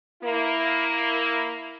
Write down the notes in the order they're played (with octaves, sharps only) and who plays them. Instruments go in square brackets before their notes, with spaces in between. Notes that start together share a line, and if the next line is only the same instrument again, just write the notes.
[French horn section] A#3 E4